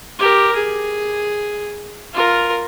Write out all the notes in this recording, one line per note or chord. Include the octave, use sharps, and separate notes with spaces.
G4 A#4
G#4
F4 A#4